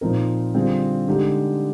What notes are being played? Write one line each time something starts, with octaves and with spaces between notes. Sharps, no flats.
A#2 F3 C4 D#4 A#4
D3 G3 C4 F4 G#4
D3 G#3 D#4 G4